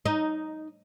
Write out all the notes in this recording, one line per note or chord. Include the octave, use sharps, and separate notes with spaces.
D#4